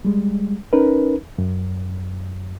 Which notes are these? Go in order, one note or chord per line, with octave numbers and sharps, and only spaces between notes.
G3 G#3
C#4 D#4 A#4 B4
F#2